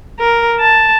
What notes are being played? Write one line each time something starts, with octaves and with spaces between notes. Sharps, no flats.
A#4
A5